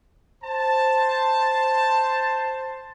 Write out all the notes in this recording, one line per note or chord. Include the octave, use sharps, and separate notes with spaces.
C5 A5